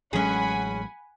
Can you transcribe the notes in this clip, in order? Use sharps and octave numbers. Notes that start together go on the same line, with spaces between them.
A1 F#3 G#3 C#4 G#4 F#5 G#5 B5